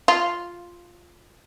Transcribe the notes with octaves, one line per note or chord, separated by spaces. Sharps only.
F4